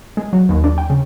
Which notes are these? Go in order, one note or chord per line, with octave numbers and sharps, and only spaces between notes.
G#3
F#3
D#2
D4
G5
C#3